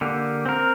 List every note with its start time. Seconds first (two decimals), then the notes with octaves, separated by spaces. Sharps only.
0.01 D3 A#3 G4
0.45 C4 A#4